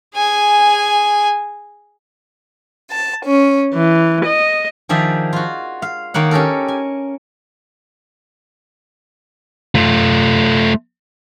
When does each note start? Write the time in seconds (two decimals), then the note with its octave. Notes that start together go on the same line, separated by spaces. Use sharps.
0.16 G#4 G#5
2.90 A5
3.24 C#4
3.73 E3
4.24 D#5
4.89 D#3 F3 G#4 D5 E5
5.33 F4 F#4
5.82 F5
6.14 D#3 A#3 C#5 F#5
6.31 C#4 G4 A4 A#4
6.68 G#5
9.75 A3 F4